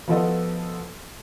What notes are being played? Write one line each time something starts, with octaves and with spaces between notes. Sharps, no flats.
F3 B3 F4 F#4 A4 D#5